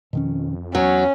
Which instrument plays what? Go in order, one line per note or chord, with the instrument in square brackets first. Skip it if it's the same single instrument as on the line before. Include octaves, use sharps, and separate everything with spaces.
[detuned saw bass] F2 [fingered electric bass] B2 D#3 C#4
[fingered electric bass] E2 [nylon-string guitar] F#3 [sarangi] C#4